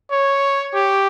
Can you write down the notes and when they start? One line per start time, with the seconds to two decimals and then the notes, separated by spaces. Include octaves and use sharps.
0.11 C#5
0.74 G4